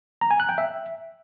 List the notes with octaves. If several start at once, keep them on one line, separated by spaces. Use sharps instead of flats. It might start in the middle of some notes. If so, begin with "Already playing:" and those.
A#5
G#5
F#6
G5
E5